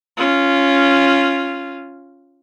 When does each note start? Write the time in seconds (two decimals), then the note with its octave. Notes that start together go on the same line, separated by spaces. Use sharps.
0.17 C#4 F4